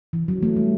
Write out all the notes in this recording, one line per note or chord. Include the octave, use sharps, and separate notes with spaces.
E3
F#3
A3
G3